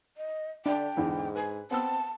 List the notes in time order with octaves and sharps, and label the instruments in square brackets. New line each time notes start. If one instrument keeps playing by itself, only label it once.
[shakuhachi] D#5
[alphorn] D3 [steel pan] D4 [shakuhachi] G5
[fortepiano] E2 D3 E3 [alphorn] G#2
[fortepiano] B4 [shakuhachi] G#5
[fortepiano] B3 E6 [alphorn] C4 [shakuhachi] A5